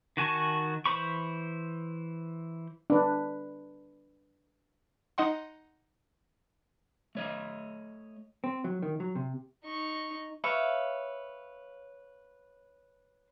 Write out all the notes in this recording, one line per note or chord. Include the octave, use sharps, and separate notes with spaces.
D#3 F#4 G#5 A5 C#6
E3 C5 B5 C#6
D4 B4
D#4 D#5 F#5 C6
A3 C#5 D#5
C4
F#3
D#3
F#3
C3
D#4 C#6
B4 C#5 E5 F5